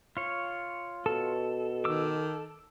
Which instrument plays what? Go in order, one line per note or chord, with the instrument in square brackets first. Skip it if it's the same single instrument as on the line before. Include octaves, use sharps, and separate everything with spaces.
[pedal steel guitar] F4 C#5
[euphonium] B2 [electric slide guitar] A4
[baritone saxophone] D#3 [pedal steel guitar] D6 E6